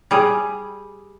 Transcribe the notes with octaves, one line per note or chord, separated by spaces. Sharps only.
G3 G#4